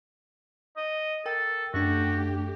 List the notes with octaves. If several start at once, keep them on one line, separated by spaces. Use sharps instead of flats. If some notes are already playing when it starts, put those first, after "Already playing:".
D#5
A4 A#4 G5
F#2 A3 D4 F#4 G4